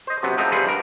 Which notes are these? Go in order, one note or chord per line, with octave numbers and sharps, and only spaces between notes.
C5 D#5
F#2 C3 F#3 B3
F3 G#3 A3 C4 D#4
C3 F3 G3 G#4 B4 F#5
G2 A#4